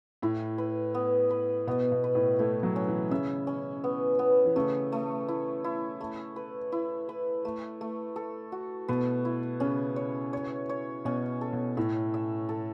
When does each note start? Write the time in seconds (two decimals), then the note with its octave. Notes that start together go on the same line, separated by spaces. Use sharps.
0.22 A2 E4
0.58 B4
0.94 B3
1.30 B4
1.67 B2 B3
1.92 B2
2.04 B4
2.15 A2
2.39 A3 E4
2.63 F#3
2.76 C#4
2.88 E3
3.11 C#3 E5
3.47 C#4
3.84 B3
4.19 B3
4.45 E3
4.56 C#3 A3
4.92 A3
5.28 E4
5.64 E4
6.00 A3
6.36 B4
6.72 E4
7.09 B4
7.45 A3
7.81 A3
8.16 A4
8.52 F#4
8.88 B2 B4
9.25 E4
9.60 C#3 C#4
9.96 C#5
10.33 C#5
10.69 C#5
11.05 B2 C#4
11.41 A4
11.53 B2
11.77 A2 E5
12.14 E5
12.49 A4